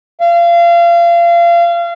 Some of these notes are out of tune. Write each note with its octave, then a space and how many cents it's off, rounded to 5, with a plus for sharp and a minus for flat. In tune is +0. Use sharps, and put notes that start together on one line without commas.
F5 -30